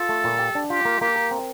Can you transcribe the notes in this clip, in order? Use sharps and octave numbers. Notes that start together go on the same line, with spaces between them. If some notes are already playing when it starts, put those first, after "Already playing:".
Already playing: F4 A4
A3
A#2
G4
D4
F4 G4
A#3
A#3 G4
A#4
C4